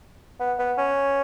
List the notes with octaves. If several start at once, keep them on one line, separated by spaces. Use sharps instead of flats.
B3
B3
C#4